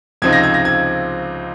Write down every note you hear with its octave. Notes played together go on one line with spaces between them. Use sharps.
C#2 C3 F3 C4 D#4 G#6
A#6
G#6
A#6
G#6